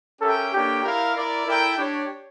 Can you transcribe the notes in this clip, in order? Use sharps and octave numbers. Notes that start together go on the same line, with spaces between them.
C#4 G4 A4 A#4 E5 G5
A#3 D4 G4 A4 C#5 G5
E4 A#4 D5 F5
E4 A#4 D5
E4 A4 A#4 E5 G5
D4 G4 C#5